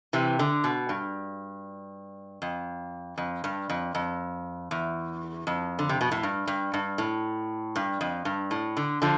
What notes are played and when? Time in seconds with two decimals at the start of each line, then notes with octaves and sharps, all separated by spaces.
0.13 C3 E3
0.39 D3
0.64 B2
0.89 G2
2.42 F2
3.18 F2
3.44 G2
3.69 F2
3.95 F2
4.71 E2
5.47 F2
5.79 D3
5.89 C3
6.01 B2
6.12 A2
6.23 G2
6.47 G2
6.74 G2
6.98 A2
7.76 G2
8.01 F2
8.25 G2
8.51 A2
8.77 D3
9.02 D3 F3